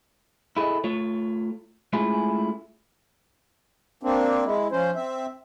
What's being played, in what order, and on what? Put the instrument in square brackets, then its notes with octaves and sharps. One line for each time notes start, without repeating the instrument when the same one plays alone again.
[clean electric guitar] E4 G#4 A4 B4 D#5
A3 F4 C#5
G#3 A3 C#4 E4 F4 G#4
[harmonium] A#3 C4 D4
G#3 E4
F3 C#4 C5
C4 E5